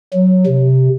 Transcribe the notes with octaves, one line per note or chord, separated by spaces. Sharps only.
F#3
C3